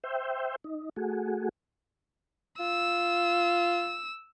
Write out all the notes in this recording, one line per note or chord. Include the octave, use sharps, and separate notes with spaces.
C5 E5 G5
D#4
A3 F#4 G#4
F4 E6